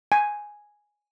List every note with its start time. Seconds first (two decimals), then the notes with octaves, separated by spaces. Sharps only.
0.12 G#5